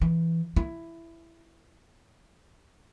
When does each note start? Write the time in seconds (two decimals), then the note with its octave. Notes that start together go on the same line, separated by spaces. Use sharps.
0.01 E3
0.56 E4